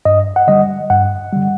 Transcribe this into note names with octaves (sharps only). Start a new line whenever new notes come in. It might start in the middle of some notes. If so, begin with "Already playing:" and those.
G2 D#5
F#5
D3 G3 D#5
G2 F#5
D3 G3